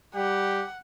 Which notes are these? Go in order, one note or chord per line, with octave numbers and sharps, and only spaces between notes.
G3 G4 F#5